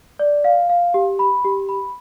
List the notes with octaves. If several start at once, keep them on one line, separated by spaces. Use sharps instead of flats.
D5
F5
F5
G4
B5
G4
B5